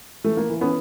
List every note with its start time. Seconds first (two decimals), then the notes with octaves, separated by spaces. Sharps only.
0.24 E3 A3
0.37 A#3
0.49 E3
0.61 B3 C#4